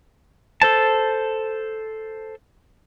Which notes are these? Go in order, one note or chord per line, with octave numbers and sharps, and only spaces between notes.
A4 C5 A5